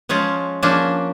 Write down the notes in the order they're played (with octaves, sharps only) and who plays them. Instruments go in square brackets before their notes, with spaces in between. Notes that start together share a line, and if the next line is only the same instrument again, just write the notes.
[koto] F3 G#3 C#4 F4
F3 A#3 C#4 D4